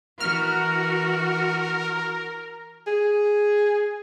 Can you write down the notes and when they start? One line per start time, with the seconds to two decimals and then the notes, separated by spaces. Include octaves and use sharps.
0.20 E3 F#4 A#4 F6
2.87 G#4